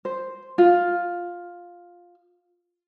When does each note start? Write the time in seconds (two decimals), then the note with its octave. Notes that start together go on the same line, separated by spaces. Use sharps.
0.05 C5
0.58 F4